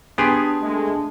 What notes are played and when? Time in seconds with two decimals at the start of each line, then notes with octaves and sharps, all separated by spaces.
0.18 B3 D4 G4 G#4 G#5 C6 D#6
0.62 G#3 A3